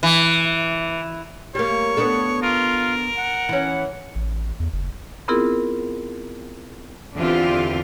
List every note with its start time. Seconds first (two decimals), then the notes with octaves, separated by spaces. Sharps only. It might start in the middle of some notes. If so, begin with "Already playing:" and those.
0.03 E3
1.55 G3 A#3 C#5
1.97 B3 D4 A4
2.42 F4 A#4
3.18 F#5
3.49 E3 C#4
4.15 A1
4.60 E2
4.73 F#1
5.28 B3 C4 E4 F4 G#4 A#4
7.16 E2 D3 E3 C4 F4 G4